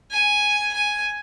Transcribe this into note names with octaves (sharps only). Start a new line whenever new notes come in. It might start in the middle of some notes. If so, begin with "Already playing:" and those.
G#5
G#5